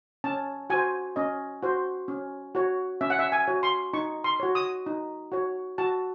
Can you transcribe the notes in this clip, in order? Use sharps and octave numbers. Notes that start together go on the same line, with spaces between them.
C#4 A5
F#4 C5 G#5
C#4 D#5
F#4 C5
C#4
F#4 C#5
C#4 E5
F#5
E5
G#5
F#4 C#5
C6
D#4 C#6
C6
F#4 C#5
D#6
D#4
F#4 C#5
F#4 A5